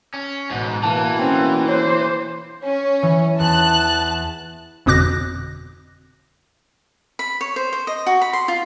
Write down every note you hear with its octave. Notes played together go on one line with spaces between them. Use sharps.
C#4
A1 G#2 B2
B2 E3 A#3 A5
C4 C#4
C5 C#5
C#4
E3
E2 A5 F#6
G1 F2 B2 D6 F#6 A#6
B5
C#5
C5
C5
D#5
F#4
B5
C6
F4